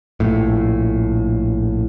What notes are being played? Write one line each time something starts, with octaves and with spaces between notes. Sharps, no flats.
A#1 A2